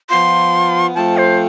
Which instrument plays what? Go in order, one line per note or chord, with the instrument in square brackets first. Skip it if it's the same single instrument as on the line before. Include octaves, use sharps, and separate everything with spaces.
[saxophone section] F3 B3 F4 [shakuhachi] C6
[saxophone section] F3 A3 C4 F4 A4 [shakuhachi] A5
[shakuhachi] C5